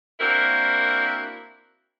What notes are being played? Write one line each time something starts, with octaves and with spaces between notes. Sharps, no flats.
A#3 C4 D4 E4 F#4 A#4